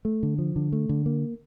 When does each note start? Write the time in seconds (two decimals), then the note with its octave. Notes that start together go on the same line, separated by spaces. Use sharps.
0.05 A3
0.23 D3
0.38 F3
0.56 D3
0.73 A3
0.89 D3
1.06 A#3